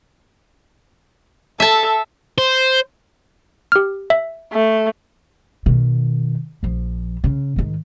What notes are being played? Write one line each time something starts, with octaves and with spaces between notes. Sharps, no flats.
A4 E5 A5
C5
G4 F6
E5
A3
B2 D#3
A#1 F3
C#3
G#2 D#3